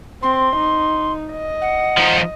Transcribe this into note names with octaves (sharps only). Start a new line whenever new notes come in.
C4 C6
D#4
D#5
F#5
F3 D#4